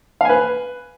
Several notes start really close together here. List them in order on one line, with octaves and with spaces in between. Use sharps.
F5 G#5 B4